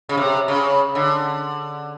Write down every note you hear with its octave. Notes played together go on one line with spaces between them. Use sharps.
C#3
C3
C#3
D3